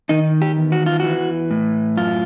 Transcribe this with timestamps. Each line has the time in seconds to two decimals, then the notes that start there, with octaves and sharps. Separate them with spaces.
0.09 D#3 D#4
0.42 G4
0.57 E2
0.72 F#4
0.86 F4
1.00 E3 F#4
1.51 A2
1.97 F#2 F4